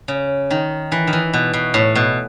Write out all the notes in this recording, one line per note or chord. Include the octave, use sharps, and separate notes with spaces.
C#3
D#3
E3
D#3
E3
B2
B2
A2
B2